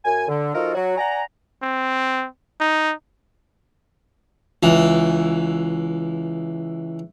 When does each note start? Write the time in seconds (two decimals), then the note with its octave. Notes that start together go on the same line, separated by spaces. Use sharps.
0.05 F#2 G#5
0.28 D3
0.55 F3 D#4 F4 F#4 A4 A#4
0.75 F#3 F#4
0.98 D5 F#5 G#5 A#5
1.62 C4
2.60 D#4
4.63 C#2 E3